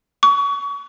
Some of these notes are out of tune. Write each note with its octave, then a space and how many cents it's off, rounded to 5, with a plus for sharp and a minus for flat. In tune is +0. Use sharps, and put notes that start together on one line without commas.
C#6 +30